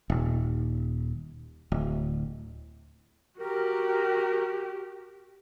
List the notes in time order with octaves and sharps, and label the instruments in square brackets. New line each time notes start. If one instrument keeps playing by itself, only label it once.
[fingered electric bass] D#1
D1
[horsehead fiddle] F#4 G4 [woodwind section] A#4